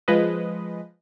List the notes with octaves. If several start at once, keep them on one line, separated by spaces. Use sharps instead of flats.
F3 G#3 B4 D#5